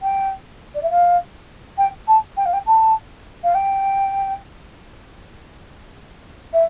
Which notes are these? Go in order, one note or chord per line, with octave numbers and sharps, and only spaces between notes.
G5
D5
E5
F5
G5
A5
G5
F5
G5
A5
F5
G5
E5